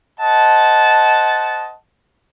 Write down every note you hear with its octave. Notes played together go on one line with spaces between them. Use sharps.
C5 D#5 F#5 A5